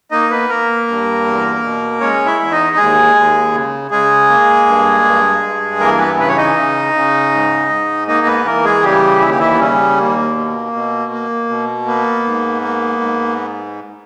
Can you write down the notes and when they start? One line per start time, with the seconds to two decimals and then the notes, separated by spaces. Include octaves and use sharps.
0.11 A#3 D#4 D#5
0.31 B3 B4
0.49 A#3 A#4
0.88 G2
1.25 E2
1.63 B2
2.01 G#3 C#4 C#5
2.26 E4 E5
2.39 E2
2.51 D#4 D#5
2.76 D#2 G#3 G#4
3.15 D#2
3.53 C#3
3.91 C#3 G#3 G#4
4.29 A#3
4.66 G2
5.04 G2
5.43 G2
5.80 E3 A#3 A#4
5.99 B3 B4
6.18 C#3 B4
6.28 C#5
6.37 D#4 D#5
6.56 C#3
6.94 C#3
7.31 G#2
7.69 G#2
8.07 A#3 D#4 D#5
8.26 B3 B4
8.45 E3 A#3 A#4
8.64 G#3 G#4
8.83 C#3 G3 G4
9.21 D#2 E4
9.30 G4
9.39 E3 E4
9.53 B3
9.59 C#3 G3 C#4
9.98 D#2 A#3
10.35 B2
10.73 B2
11.11 A#3
11.49 B2
11.86 A#3 B3
12.24 G#2
12.62 A#3
13.00 G#2